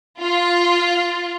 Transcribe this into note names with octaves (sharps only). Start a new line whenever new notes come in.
F4